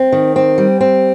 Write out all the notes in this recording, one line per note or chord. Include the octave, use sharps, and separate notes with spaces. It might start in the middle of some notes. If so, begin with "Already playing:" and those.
Already playing: C4
D#3
C4
G3
C4